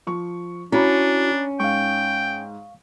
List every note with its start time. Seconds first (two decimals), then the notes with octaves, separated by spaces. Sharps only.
0.07 F3 C#6
0.72 C#4 D4 E4 F#4 A#5 B5
1.60 G#2 F5 G5 C#6